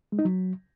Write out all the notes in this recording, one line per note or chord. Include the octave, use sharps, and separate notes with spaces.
G#3
D#4
F#3